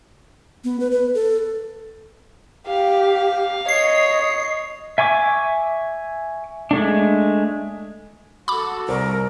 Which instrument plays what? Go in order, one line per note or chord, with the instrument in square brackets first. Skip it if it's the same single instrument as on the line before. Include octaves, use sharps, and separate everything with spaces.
[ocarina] B3
B4
B4
A4
[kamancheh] G4 [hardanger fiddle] F5
[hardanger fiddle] C#5 [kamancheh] D#5 [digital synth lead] C7
[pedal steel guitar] E5 G#5 C#6 D6
G#3 A3 D4
[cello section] F#4 A4 [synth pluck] B5 D6
[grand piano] C2 C5 [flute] A#4